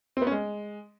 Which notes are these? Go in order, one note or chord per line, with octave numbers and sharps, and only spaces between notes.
C4
B3
C#4
G#3